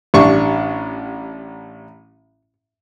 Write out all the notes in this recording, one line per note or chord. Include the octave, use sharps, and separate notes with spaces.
A1 G3 D4 C#6